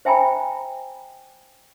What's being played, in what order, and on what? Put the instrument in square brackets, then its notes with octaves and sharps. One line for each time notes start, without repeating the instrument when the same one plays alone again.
[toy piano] C5 E5 G5 G#5 A#5 B5